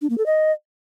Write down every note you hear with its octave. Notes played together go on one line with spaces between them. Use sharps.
D4
A#3
A4
D#5